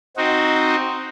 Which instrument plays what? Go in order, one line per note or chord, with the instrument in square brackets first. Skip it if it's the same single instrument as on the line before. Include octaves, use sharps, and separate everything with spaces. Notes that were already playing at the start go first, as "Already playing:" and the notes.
[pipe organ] C4 D#4 F#4